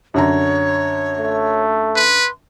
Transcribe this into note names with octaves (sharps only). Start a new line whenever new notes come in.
F#2 D3 C#5 A#5
A3
B4 C6